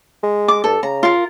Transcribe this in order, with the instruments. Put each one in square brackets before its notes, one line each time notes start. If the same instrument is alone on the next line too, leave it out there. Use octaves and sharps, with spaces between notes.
[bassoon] G#3
[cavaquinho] D6
[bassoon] G2 [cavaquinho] A4
[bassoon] C#3 [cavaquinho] A#5
[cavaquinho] F4 A#4